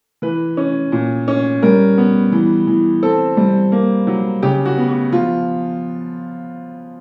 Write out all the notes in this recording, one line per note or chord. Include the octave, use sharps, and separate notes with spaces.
E3 B4
C#4
A#2
C#4
G3 A#4
B3
E3
E3
C4 A4
G3
A#3
F#3
C#3 G4
F#4
B3
F#4
F3 F4